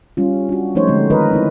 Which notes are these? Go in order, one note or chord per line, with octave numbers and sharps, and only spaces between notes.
G3 C#4 F4
D4 F#4
F3 A3 C#4 D#4 C5 C#5
D3 G#3 A3 B3 C4
D#3 A#4 B4 D#5
C4 D#4 E4